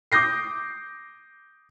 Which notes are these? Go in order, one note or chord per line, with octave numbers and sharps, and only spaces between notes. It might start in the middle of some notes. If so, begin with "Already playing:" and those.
D6 D#6 G6 A#6 C7